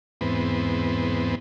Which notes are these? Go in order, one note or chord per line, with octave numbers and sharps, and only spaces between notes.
E2 G#2 B3 C4